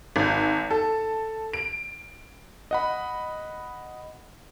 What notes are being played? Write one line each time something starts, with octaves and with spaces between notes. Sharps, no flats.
G#1
A4
D7
D#5 F#5 B5